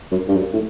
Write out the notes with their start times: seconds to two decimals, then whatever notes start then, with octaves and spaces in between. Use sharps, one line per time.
0.12 F#2
0.28 G2
0.36 F#2
0.53 A2